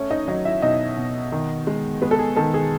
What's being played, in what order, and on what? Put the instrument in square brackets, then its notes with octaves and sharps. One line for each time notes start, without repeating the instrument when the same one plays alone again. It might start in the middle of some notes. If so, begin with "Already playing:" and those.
Already playing: [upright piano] A3 C#4 C#5
D#4 D#5
F#3 D#4 D#5
E4 E5
B2 D#4 D#5
B2
D#3
G#3
G#3 B3 B4
A4
G#4
D#3 A4
G#4